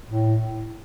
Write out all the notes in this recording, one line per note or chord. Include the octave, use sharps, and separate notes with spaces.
A2